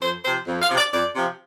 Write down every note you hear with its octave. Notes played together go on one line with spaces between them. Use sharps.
F2 C5
C3 F3 C5
F2
F5
C3 F3
D5
F2 D5
C3 F3